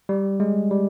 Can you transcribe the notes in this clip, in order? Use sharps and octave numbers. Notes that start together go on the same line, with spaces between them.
G3
G#3
G3